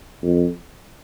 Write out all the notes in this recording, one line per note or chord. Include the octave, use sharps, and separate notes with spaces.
F2